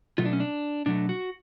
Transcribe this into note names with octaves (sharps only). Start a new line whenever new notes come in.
B2 F#3 A3 F4
D4
C#4
D4
B2 F#3 A3 D4
F#4